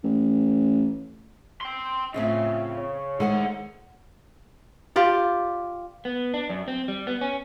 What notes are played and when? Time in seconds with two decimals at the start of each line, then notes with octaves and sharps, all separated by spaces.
0.04 A1
1.61 G5 C6
2.14 A2 C#3 C4 F4 E5
2.78 C#5
3.20 D#3 G#3 E4 A4 C5 F#5
4.96 F4 G4 D5
6.05 B3
6.34 D4
6.50 F#2
6.68 C4
6.88 G3
7.07 B3
7.21 C#4